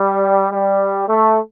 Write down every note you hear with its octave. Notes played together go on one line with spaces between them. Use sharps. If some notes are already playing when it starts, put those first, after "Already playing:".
Already playing: G3
G3
A3